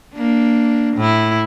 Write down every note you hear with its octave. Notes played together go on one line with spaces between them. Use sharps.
A#3 D4
A2 E4